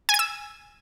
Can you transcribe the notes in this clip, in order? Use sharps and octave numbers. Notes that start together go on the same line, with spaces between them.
G#5
G#6
E6